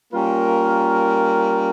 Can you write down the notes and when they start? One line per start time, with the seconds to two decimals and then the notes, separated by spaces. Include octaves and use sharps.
0.13 G3 A#3 C#4 F4 A#4